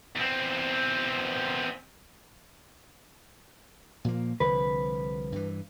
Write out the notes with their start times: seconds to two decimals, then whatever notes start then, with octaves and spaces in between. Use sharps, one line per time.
0.16 E2 C4
4.04 A#2 F3 A#3
4.40 C2 D3 F3 B4
5.32 G2 E3